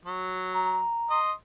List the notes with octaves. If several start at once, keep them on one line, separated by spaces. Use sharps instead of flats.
F#3
A#5
D#5 C6